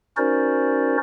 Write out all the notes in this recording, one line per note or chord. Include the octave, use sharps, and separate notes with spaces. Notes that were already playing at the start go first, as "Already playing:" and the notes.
C#4 D#4 F#4 A#4 C5 D5